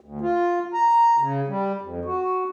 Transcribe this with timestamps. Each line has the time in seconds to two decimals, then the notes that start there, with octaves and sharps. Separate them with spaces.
0.01 D2
0.21 F4
0.74 A#5
1.18 C#3
1.48 G3
1.81 F2
2.05 F#4